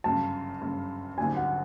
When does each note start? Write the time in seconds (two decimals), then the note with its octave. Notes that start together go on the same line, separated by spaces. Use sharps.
0.04 G1 F#2 C#3 A5
0.61 G1 F#2 C#3
1.17 G#1 F#2 D3 G3 G#5
1.37 F#5